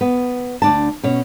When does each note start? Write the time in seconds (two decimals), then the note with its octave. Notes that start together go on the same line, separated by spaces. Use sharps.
0.01 B3
0.62 D2 D4 A5
1.04 B2 C#4